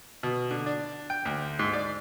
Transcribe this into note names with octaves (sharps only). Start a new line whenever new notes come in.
B2
D3
D4
G5
D2
G#2
D5